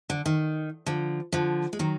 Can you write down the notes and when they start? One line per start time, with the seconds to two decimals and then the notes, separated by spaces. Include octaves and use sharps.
0.10 D3
0.26 D#3
0.86 D3 F3
1.32 D3 F3
1.73 G#3
1.79 D#3 F#3